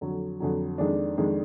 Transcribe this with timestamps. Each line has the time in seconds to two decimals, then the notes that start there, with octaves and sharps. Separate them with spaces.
0.01 F2 D3 F#3
0.40 F2 D3 F#3
0.78 F2 D#3 G#3 D4
1.17 F2 D#3 G#3 D4